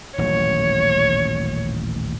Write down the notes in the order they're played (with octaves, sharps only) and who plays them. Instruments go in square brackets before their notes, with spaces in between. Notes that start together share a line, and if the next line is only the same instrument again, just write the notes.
[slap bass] D#1 A1 F#3 [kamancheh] C#5